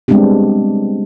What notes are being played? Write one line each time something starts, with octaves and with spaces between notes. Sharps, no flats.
G3 G#3 B3 C4 D4 G4